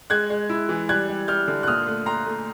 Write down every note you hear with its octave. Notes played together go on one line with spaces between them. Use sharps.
G#3 F#6 G#6
G#3
E4
E3
G3 F#6 G#6
G3
G3 F6 G6
D3
F#6
A#2 D#6 F6
A3
A3 A#5 C6
A3